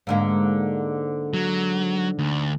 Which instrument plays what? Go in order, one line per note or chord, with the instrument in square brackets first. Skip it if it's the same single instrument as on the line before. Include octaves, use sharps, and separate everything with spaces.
[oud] G#2 D3 A#3
[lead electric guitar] F#3
D2